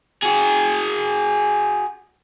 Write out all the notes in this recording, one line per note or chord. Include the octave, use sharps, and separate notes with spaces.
F#4 G#4